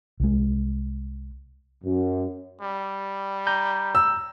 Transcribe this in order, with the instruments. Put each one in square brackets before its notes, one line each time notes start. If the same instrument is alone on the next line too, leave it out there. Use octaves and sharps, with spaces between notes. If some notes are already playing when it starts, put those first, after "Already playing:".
[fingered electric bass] C2 G#3
[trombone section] F#2
[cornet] G3
[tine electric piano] A#5 G6
[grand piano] E6